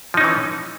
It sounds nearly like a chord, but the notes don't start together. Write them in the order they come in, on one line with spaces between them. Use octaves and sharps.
F3 D#4 C#4 E3